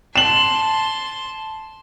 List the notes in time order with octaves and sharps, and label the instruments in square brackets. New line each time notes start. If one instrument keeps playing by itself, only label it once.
[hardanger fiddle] A5 C6 [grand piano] E7 F#7